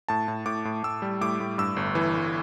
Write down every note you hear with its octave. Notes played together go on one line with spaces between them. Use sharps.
A2 A5
A2
A2 D6
A2
A2 E6
G3
A2 D6
A2
G2 E6
G1
E3
G1